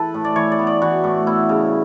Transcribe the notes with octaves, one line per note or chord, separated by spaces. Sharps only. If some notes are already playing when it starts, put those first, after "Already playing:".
Already playing: E3 A4 B4
A2
D5
E3 C#5
D5
B3
D5
E3 F#4
A2
B3 E4
C#3